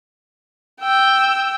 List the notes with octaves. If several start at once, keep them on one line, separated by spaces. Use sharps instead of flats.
G5 E6